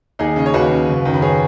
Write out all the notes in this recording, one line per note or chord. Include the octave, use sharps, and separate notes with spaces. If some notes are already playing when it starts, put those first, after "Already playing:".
D#2 D#4 G#4
C#3 D#5
C#5
D#2 F#4 B4
C#3
F#1
F#2 D#3
B4
G#4 C#5